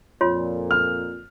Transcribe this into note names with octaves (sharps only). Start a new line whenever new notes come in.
F2 A#2 F4 C#5 C6
F6